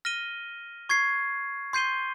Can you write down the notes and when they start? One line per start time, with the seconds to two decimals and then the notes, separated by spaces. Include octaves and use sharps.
0.05 F6 A#6 D#7 G7
0.89 C#6 G#6 C7
1.73 C6 G6 C7 D#7 G7